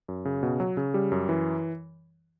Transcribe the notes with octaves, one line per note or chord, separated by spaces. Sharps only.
F#2
C#3
B2
F#3
C#3
G3
F#2
E3